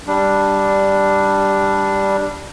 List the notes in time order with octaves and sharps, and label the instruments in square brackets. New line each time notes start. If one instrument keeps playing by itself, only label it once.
[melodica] G3 D4